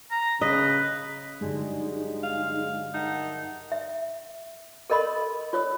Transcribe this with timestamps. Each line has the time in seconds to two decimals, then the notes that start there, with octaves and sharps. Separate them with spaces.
0.11 A#5
0.41 C#3 B4 D#5
1.41 G2 D3 F#3 G#3 D#4
2.23 F5
2.94 D#4 A#4 E5 F#5 A5
3.72 E5
4.90 A4 A#4 D#5 B5 C6
5.53 F4 C#5 D#6